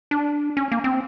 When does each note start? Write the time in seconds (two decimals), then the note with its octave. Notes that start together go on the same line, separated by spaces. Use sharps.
0.11 D4
0.57 C#4
0.72 A#3
0.84 C4